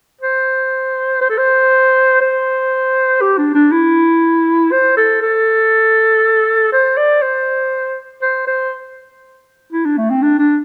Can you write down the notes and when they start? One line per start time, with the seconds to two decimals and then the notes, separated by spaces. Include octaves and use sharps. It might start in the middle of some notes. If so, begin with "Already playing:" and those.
0.21 C5
1.21 C5
1.29 A4
1.38 C5
2.21 C5
3.21 G4
3.38 D4
3.54 D4
3.71 E4
4.72 C5
4.97 A4
5.22 A4
6.72 C5
6.97 D5
7.22 C5
8.22 C5
8.47 C5
9.73 E4
9.85 D4
9.98 A3
10.10 C4
10.22 D4
10.39 D4